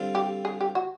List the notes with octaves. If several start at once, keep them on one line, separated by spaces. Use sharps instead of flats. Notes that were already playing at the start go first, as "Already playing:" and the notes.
Already playing: D3 G3 C4 F4
G4
G#4
G4
F#4